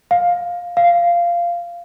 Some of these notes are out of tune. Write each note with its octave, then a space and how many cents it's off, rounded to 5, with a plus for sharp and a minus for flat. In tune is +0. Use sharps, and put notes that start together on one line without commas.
F5 +10
F5 -15